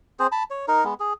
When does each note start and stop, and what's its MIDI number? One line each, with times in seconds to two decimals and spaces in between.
0.20 0.27 60
0.20 0.27 68
0.20 0.27 72
0.32 0.43 81
0.32 0.43 83
0.50 0.66 73
0.68 0.84 63
0.68 0.84 70
0.84 0.94 56
0.84 0.94 59
1.00 1.13 68